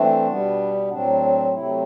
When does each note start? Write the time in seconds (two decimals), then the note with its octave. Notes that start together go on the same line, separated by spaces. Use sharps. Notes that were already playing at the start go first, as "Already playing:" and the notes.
Already playing: E3 A3 C4 D4
0.26 B2 G3 B3
0.90 A2 F#3 C4 D4
1.52 C3 F#3 A3 C4 E4